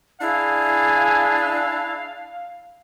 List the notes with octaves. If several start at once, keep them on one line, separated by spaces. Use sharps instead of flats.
D4 E4 G#4 F5